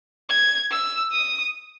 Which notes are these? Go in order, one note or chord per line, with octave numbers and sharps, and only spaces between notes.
G#6
E6
D#6